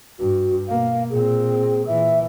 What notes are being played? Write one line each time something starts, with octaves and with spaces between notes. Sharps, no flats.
G2 F#4
B2 A#3 F5
A#2 C4 G#4
A#2 E3 E5